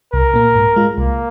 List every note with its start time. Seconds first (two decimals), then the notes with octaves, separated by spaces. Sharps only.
0.13 C2 A#4
0.34 A#2 A#3
0.55 G#2
0.76 G#3 F4
0.98 C2 A#3